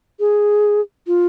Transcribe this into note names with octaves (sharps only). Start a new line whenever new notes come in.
G#4
F4